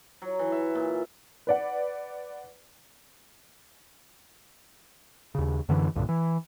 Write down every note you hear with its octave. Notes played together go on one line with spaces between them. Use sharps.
F#3
E3
E5
A#2
B4 D5 F#5
D#2 C#3
F#2 D3 E3
C2 G2 A#2 D3
E3